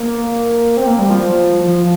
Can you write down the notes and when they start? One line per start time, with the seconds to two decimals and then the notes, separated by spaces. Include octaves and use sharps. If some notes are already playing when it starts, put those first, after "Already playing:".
Already playing: A#3
0.77 C4
0.87 A#3
0.99 G3
1.10 F3
1.63 F3